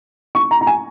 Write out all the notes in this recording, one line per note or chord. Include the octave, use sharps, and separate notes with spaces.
C#6
A#5
A#5
G#5